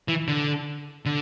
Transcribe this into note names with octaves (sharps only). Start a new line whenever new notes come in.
E3
D3
D3